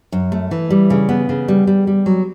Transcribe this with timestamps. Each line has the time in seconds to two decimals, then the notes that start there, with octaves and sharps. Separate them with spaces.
0.12 F#2
0.32 A3
0.51 E3
0.70 G3
0.90 C#3
1.09 B3
1.29 C#3
1.48 G3
1.67 G3
1.87 G3
2.06 F#3